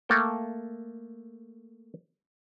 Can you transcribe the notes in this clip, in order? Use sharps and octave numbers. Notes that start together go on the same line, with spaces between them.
A3 A#3 A4 G5